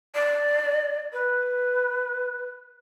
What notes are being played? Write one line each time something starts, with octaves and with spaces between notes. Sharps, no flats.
D5
B4